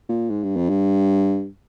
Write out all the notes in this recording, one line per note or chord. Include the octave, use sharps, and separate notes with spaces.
A#2
G#2
G2
F2
G2